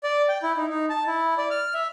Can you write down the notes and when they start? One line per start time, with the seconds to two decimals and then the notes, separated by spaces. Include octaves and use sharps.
0.04 D5
0.29 G5
0.43 E4
0.57 D#4
0.70 D#4
0.90 A5
1.07 E4
1.38 D5
1.50 F6
1.74 E5